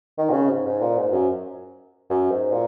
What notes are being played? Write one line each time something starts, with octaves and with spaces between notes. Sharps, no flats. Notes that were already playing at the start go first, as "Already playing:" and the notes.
D#3
A#2
C#3
G#2
G#2
A#2
G#2
F#2
F#2
G#2
A#2